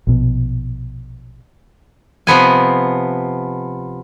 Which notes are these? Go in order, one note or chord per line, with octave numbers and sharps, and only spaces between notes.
A#1 B2
C3 F3 B3 G#5